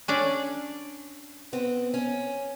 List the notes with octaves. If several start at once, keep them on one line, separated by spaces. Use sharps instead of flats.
C#4 D4 D5
B3 C4
C#4